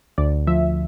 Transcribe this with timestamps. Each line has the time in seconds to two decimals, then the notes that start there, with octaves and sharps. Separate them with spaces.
0.18 D2 D5
0.47 F3 E5